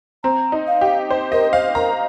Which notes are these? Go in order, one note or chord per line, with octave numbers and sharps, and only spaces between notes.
C4 A#5
D#4
F5
G4
C5
A#4 D#5
C5 F5
A#4 A#5